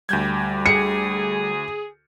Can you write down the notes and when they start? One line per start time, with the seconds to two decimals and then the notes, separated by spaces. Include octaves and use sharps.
0.09 D2 G3 G6 G#6
0.66 G#4 C#7